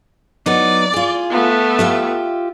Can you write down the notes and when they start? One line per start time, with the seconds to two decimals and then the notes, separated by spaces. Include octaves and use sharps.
0.46 F#3 B3 D#4 D5
0.93 F4 G#4
1.30 A3 B3
1.79 F4 G4 E5